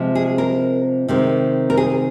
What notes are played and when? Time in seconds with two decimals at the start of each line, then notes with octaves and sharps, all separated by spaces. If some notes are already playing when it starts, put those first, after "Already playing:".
Already playing: C3 F3 G#3
0.15 G#4
0.38 A#4
1.08 C3 D#3 G#3
1.70 A#4
1.77 G#4